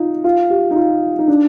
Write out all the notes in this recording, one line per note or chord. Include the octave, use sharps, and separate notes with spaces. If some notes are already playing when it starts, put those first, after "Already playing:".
Already playing: D#4 F4
F4
G4
D#4
F4
D#4
D4